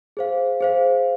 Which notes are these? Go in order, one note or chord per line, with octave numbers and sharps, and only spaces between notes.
G#4 C5 F5
G#4 C5 F5